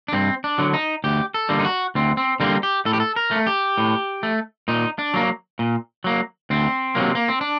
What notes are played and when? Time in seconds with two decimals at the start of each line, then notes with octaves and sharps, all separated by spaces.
0.08 D4
0.13 G2 C4
0.44 D4
0.58 D3 F#3
0.73 D#4
1.04 D2 G4
1.34 A4
1.49 D3 G3 A#3
1.59 D#4
1.65 F#4
1.95 D2 C4
2.17 C4
2.40 D3 G3 A#3 C4
2.63 G4
2.85 A2 A4
2.93 G4
3.00 A4
3.16 A#4
3.31 A3
3.47 G4
3.78 A2
4.23 A3
4.68 A#2 D#4
4.99 D4
5.14 F#3 A#3
5.59 A#2
6.04 F#3 A#3
6.50 D2 C4
6.95 C3 D#3 F#3 A#3
7.15 A#3
7.28 C4
7.41 D4